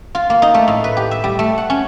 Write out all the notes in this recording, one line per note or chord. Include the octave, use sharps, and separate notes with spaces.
F4
A#3
D#4
A3
A2
B4
G4
E5
G3
A3
F#5
C#4